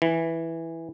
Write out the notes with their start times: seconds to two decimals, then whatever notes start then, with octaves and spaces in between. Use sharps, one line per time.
0.02 E3